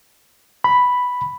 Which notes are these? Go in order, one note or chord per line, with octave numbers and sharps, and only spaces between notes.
B5